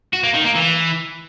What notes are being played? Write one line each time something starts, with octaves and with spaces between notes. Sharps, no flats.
F#4
A#3
D#3
A#3
E3